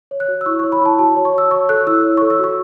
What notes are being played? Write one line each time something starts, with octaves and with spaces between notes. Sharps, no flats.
C#5
F#6
F#4
E6
E4 C#6
C#5 C#6
B5
E4 A5
F#4 A5
A5
C#5
C#6
F#4 E6
C#5 C#6
A4 F#6
E4 E6
C#5
C#6
A4
E6
F#4 C#6